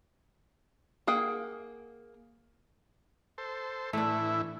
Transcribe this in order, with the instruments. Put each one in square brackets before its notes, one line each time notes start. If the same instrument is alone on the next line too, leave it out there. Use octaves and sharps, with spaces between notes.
[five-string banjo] A#3 G#4 F#5 G5
[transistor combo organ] A4 C5
[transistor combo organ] A2 E3 E4 [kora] A3 D4